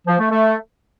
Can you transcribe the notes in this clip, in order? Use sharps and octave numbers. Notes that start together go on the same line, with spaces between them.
F3
A3
A3